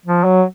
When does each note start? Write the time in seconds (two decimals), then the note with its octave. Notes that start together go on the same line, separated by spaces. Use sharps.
0.06 F3
0.24 F#3